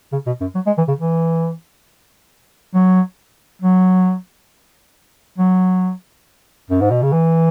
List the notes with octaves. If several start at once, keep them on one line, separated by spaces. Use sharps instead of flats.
C#3
B2
F#2
F#3
G#3
E3
C#3
E3
F#3
F#3
F#3
F#2
G#2
B2
C#3
E3